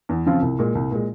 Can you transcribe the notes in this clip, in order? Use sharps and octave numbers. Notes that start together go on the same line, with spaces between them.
E2
C#3 F3 C4 F4
C2
A#2 G#3
C2
A#2 G#3